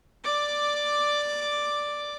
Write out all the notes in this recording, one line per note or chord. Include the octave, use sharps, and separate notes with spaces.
D5 D6